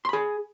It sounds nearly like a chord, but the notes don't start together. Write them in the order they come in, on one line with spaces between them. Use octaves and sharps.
C6 B5 G#4